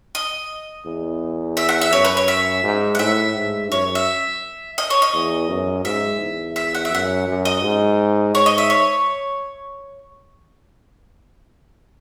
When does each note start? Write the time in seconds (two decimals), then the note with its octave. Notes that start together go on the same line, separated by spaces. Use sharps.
0.15 D#5
0.86 E2
1.57 E5
1.69 F#5
1.81 E5
1.93 F#2 C#5
2.05 B4
2.17 C#5
2.28 E5
2.64 G#2
2.95 F#5
2.99 A2 E5
3.35 G#2
3.71 F#2 C#5
3.95 E5
4.78 D#5
4.90 C#5
5.02 D#5
5.14 E2
5.49 F#2
5.85 G#2 E5
6.21 E2
6.56 E5
6.75 F#5
6.85 E5
6.92 F#2 F#5
7.28 F#2
7.45 D#5
7.63 G#2
8.35 G#2 C#5
8.46 D#5
8.58 E5
8.70 C#5